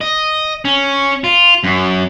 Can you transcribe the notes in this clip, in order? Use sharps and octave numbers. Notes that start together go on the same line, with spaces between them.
D#5
C#4
F4
F#2